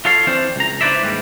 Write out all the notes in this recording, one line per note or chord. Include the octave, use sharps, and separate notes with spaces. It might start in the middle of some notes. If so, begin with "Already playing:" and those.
F4 A4 C#5 F5
E3 C4 D4 C5
C#2 A#5
D4 E4 B4 C5 D5 E5
D#2 G#2 E3 G3